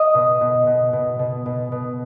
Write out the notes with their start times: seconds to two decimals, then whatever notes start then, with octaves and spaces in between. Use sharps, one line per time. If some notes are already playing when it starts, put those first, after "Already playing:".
Already playing: D#5
0.15 B2
0.41 B2
0.67 B2
0.93 B2
1.19 B2
1.46 B2
1.72 B2